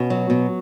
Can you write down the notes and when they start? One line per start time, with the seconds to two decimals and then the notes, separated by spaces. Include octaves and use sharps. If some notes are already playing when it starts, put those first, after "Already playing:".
Already playing: B2 C#4 F#4
0.10 F#3
0.30 B2